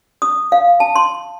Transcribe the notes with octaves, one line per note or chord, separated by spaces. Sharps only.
D#6
F5
A5
C6